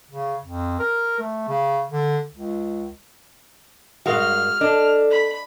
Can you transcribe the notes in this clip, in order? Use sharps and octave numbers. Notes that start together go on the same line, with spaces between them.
C#3
F2
A#4
A3
C#3
D3
C#2
G2 G#3 F#4 A#4 F5 F6
D4 A4 D#5
B5